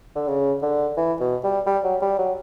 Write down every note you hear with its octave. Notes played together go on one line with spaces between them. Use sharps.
D3
C#3
D3
E3
B2
G3
G3
F#3
G3
F#3